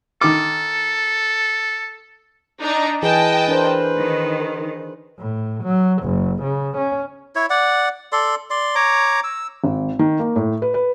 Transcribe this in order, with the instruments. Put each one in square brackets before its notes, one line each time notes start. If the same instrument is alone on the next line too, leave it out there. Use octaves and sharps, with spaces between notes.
[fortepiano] D#3 D6 [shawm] A4
[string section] D4 D#4 A#5
[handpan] E3 G#4 [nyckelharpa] B4 [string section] D#5 G5 A5
[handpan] D4 A#4 C5
[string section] D#3
[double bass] A2
F#3
F#1
C#3
C#4
[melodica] E4 C#5
D5 F#5
A4 D5 C6
D5 C6
C#5 A#5 D6
E6
[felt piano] G#1
D#3
A#3
A2
B4
B4